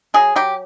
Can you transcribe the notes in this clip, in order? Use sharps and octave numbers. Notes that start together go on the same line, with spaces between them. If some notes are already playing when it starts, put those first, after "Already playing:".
F#3 G#4
F#3 G4